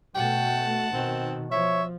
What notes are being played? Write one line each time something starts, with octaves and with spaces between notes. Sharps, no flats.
B2 A3 F#5 G5 A5
B2 D#3 C4
F3 C#5 E5